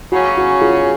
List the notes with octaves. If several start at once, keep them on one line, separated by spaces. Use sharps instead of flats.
C#3 F#3 C#4 F#4
F#4
F4 G#4